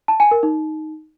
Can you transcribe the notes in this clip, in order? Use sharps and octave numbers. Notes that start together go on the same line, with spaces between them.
A5
G#5
A#4
D#4